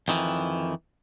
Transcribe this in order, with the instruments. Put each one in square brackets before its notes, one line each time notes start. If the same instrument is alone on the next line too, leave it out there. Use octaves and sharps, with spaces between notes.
[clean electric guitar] F2 D#3 E3